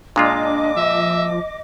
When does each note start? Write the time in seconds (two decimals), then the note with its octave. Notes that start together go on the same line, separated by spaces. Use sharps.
0.16 A#2 G#3 D4 F4 D#5 D6
0.77 F3 E5